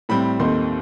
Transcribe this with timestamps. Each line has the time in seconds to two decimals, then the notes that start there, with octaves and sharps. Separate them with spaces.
0.09 A2 G3 C4 B5
0.40 D#2 D#3 A3 C4 C6